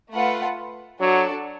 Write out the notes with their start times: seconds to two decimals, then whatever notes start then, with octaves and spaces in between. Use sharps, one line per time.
0.12 A3 F4 B4 F#5
1.00 F#3 D4 F#4 A4 D5